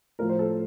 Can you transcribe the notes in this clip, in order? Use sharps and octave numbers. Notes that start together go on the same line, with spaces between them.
A2 F3 A#4
C5
A4